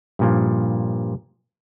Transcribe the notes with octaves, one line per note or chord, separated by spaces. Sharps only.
G2 A#2 F3